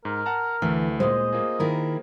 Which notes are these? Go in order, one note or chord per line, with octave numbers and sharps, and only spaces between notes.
G#2 A#4
F#5 A5 A#5
D2 E3 A3
A#2 G#3 C5 D#5
A#3 F4 G#4
D#3 E4 A#4